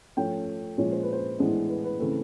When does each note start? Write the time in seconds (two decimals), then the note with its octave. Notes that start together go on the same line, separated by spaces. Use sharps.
0.17 F3 A3 C#4 G5
0.77 A#2 F3 G#3 C#4 C#5
0.92 C5
1.03 B4
1.13 C5
1.38 A2 E3 G#3 B3 D4
1.69 B4
1.84 B4
1.99 C#3 E3 A3 C4